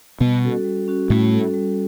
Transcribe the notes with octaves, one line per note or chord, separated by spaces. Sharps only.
B2 G3 B3
C#4 F#4 A4
G3
C#4 F#4 A4
A2 G3 A3
C#4 F#4 A4
G3